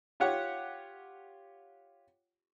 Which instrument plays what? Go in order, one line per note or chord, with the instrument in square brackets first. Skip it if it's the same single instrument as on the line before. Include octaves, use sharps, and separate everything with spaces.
[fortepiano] F4 G4 C#5 F#5